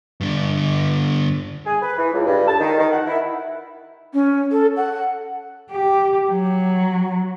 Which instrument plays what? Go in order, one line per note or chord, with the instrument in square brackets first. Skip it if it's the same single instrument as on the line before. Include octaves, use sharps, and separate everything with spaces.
[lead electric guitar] G2 D3
[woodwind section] G#4
B4
E3
C#2
G2
A5
D#3
D#3
F#5
E4
[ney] C#4
A4
F#5
[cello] G4
F#3